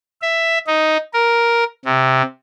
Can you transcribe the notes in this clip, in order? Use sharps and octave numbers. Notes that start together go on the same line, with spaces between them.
E5
D#4
A#4
C3